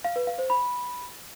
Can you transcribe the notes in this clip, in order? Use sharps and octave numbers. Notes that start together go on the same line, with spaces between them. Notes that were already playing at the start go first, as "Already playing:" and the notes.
F5
B4
F5
C5
B5